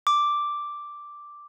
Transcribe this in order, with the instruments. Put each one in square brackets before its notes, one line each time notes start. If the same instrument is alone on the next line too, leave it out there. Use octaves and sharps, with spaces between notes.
[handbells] D6